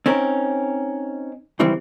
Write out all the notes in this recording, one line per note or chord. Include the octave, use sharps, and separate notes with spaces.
C4 C#4 D#4 A#4
C#2 D#3 E3 G3 C4